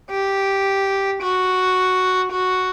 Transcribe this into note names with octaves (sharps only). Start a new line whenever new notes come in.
G4
F#4
F#4